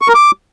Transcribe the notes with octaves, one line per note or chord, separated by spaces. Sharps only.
C#6
A#4
D6